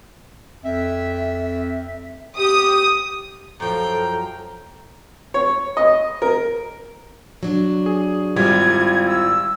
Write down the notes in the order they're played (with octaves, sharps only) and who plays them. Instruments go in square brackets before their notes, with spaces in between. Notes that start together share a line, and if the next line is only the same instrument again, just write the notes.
[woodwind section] F2 C4 E5
[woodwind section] G4 [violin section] D#6
[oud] F#2 F3 [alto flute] A4 [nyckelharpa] G5 [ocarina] A#5
[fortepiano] C#5
D#5
A#4
[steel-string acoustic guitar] F#3 D4
[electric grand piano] G#4
[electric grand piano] G#1 G3 [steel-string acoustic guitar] E4 F4 [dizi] G#6
[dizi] E6